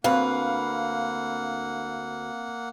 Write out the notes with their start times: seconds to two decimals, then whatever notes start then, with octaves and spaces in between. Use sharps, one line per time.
0.04 D2 A#3 C4 B4 F5 F#5